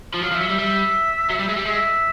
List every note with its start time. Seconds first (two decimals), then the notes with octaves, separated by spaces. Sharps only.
0.14 F3
0.23 F#3 F5
0.32 F3
0.35 E5
0.41 F#3
0.46 G3 E5
0.59 G3 E5
1.30 F#3
1.39 G3
1.48 G#3
1.57 G3
1.66 G#3 E5